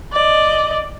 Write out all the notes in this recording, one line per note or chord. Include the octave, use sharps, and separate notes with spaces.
D5 D#5